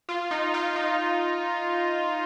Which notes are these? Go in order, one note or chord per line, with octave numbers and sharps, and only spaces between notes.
F4
D#4
F4
D#4